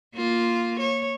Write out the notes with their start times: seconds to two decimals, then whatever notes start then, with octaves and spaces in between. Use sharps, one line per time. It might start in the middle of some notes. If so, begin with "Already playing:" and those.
0.15 A#3 F4
0.80 C#5